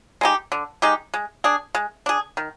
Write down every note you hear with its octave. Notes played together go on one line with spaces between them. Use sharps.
G#3 D#4 G4
D3
G#3 D#4 G4
G#3
D4 G#4
G#3
D4 G#4
D#3